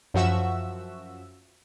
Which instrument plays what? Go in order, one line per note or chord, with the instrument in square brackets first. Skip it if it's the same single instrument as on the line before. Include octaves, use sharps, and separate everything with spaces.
[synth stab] F#2 F3 F#4 E5 E6